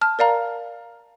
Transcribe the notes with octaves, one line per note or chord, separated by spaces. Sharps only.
A5 F6
A#4 D5 F5 A#5